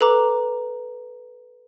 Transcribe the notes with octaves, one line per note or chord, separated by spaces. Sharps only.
A4 B4 A#5 D6